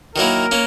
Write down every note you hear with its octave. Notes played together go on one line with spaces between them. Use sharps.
D#3 F#3 A#3 E4 A#4
A#3 C#4